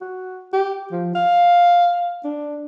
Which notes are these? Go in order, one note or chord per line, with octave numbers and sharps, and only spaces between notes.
F#4
G4
F3
F5
D4